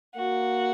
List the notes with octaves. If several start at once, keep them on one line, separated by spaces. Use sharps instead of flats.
A#3 F#4